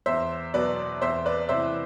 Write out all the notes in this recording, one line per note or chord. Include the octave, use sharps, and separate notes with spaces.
E2 C5 E5
B2 F#3 B4 D5
E2 C5 E5
B4 D5
C3 E3 C5 E5